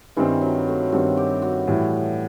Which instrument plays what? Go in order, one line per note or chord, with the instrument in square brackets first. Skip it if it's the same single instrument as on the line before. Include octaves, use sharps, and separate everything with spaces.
[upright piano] G2 D#3 G3 C4 [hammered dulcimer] E3
[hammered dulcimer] F#3
A3
[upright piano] G2 D#3 G3 C4 [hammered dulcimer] F#4
[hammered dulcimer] G4
F#4
[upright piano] A2 E3 G3